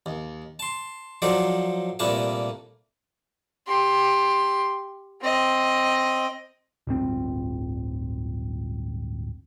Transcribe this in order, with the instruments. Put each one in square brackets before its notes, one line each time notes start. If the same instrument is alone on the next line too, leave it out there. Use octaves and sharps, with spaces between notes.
[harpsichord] D#2
A5 C6
F3 F#3 D#4 A4 C5 D5
C2 A#2 A3 A#3 B4 A5
[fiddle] G4 C6
C4 D#5
[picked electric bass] D1 G1 C4